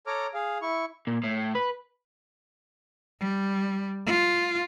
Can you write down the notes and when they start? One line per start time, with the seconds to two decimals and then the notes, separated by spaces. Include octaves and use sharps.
0.07 A4 C#5 A#5 D6 F6
0.34 G#4 F5
0.62 E4 C#6
1.07 A#2
1.24 A2
1.55 B4
3.20 G3
4.06 F4